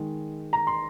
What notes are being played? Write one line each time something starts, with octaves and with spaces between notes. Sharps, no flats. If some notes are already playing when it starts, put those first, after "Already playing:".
Already playing: D#3 G#3
A#5
C6